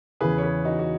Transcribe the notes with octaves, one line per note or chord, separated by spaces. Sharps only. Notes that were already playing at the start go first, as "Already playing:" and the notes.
E2 C#3 E3 G#4 B4
C#5
G#4 B4
D#4 F#4
F#4